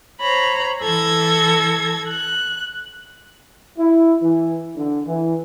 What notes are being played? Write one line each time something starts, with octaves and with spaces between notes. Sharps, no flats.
C5 C#5 A#5 B5
E3 A4 E6 G#6 A#6
F#6
E4
E3
D3
E3